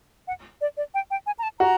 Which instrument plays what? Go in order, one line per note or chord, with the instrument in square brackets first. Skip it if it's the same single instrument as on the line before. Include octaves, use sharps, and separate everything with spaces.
[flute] F#5
D5
D5
G5
G5
G#5
A#5
A5
[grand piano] F#4 [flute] A#5